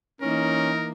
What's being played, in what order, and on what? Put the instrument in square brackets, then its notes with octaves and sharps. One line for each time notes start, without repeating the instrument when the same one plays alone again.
[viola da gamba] E3 A#3 [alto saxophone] C#4 [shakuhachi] D#4 [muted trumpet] A#4